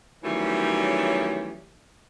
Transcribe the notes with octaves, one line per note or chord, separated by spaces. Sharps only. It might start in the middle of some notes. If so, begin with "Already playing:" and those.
D#3 E3 F#3 G3 A3 C#4